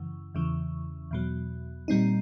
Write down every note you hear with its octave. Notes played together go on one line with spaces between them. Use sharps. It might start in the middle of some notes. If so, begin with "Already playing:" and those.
Already playing: F#2 C#3 E3
E2 C#3 E3
E2 B2 F#3
A#2 G3 C4 D#4